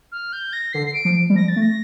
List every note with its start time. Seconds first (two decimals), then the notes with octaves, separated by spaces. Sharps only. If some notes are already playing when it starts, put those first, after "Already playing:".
0.12 F6
0.33 G6
0.53 A#6
0.73 D3 C7
0.87 C7
0.94 D7
1.05 F3
1.30 G3
1.35 F3 A#6
1.48 A6
1.56 A3
1.62 A#6